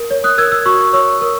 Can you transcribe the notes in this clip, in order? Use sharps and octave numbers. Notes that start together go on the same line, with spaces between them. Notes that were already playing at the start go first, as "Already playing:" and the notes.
Already playing: A#4
C#5
D#6 F#6
A#4 E6 G#6
E6 G#6
F#4 C#6 E6
C#5 C#6 E6
A#4